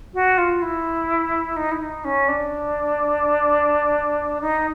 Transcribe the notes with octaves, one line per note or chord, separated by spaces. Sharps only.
F#4
F4
E4
D#4
E4
D#4
C#4
D4
D#4